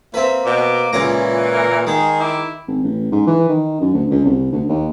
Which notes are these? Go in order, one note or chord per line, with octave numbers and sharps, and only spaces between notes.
A#3 C4 B4 E5
B2 D6
C#2 A#2 E3 C#4 A#5
A#4
D#3 G#3 G#4
E4 D6
G#1
A1
G#2
E3
D#3
F#2
D2
C#2
C2
D2
D#2